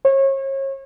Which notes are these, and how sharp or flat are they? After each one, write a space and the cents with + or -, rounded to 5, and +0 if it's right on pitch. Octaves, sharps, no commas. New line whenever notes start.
C#5 -35